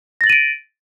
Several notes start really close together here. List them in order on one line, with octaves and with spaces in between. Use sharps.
A#6 A6 F#7 D#7 D7